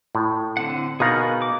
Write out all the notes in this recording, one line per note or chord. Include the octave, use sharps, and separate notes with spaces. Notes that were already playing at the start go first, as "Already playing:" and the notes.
A2
D3 C4 F#5
B2 D#4 G#4 A#4 F5 F#5
D6